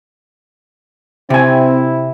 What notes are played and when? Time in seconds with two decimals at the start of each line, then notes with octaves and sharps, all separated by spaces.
1.30 C3 C4 E4 G#5